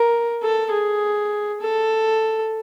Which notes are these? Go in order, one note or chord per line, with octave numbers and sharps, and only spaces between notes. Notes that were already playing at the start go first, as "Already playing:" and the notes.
Already playing: A#4
A4
G#4
A4